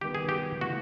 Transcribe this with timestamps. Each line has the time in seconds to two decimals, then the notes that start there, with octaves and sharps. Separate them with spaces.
0.01 D#3 G3 B3 G4
0.15 G#4
0.29 G4
0.61 C#3 E3 A3 F#4